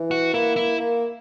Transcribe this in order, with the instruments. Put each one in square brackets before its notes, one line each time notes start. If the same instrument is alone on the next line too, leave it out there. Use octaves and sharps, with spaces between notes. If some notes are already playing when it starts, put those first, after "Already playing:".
Already playing: [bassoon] E3
[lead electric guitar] F#4
[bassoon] A#3 [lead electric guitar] E4
[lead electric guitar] E4
[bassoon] A#3